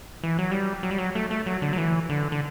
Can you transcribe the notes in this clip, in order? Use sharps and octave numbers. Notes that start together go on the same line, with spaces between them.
E3
F#3
G3
F#3
G3
F#3
A3
A3
F#3
D3
F#3
E3
D3
D3